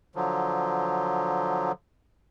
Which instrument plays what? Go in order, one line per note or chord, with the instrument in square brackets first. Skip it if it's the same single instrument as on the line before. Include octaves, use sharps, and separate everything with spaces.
[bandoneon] D3 F3 F#3